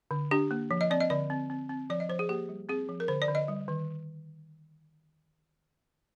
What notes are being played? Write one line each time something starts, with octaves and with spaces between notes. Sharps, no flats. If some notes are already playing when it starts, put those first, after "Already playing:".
D3
D4 G4
A#3
F3
D#5
C4 D5
D#5
D3 D5
C4
C4
C4
F3 D5
D#5
F3 C5
G#4
A#3 G4
G3
C4 G#4
F3
A#4
D3 C5
D5
D3
D#5
G3
D#3